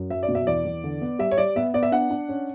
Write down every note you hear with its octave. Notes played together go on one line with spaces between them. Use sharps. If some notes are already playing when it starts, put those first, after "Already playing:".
Already playing: F#2
F#3 E5
D5
B2
E5
E2 D5
E2
D3
B3
G3 E5
C#5
G3 D5
B3 E5
B3 D5
E5
D4 F#5
D4
C#4